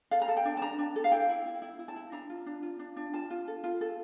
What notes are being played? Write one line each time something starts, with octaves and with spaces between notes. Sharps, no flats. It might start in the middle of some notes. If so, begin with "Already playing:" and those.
A4 F5
A#5
A4 A5
G5
D4
A5
D4 A#5
D4
A4
F5
E4 G5
E4
E4
E4
E4
A5
E4
D4 A#5
F4
D4
F4
D4
D4
F4 A5
F4
A4
F4
A4